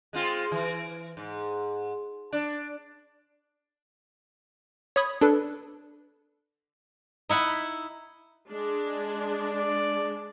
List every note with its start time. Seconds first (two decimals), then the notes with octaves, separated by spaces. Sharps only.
0.13 G#3 C4 F4
0.52 E3
1.17 G#2
2.33 D4
4.96 C#5 B5 D#6 G#6
5.21 D4 A4 B4
7.29 D#4 E4 F#5 B5
8.50 G#3 D4
9.40 D5